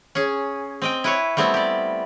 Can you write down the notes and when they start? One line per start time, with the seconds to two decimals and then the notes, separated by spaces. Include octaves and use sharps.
0.15 C#4 G#4
0.82 C4 D#5 G5
1.04 E4 B4 C#5
1.37 G3 A3 B3 C4 E4
1.54 G4 D5